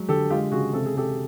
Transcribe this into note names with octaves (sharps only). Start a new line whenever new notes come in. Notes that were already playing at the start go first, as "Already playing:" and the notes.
Already playing: F#3 G#3
D3 G4 A4
G#3 F4 G4
C#3 F#4 G#4
C3 A4
G#4
C3 G4 A4